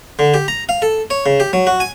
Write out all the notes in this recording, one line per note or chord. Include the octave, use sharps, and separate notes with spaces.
D3
G4
A#5
F5
A4
C#5
C#3
G4
F#3
F#4
G#5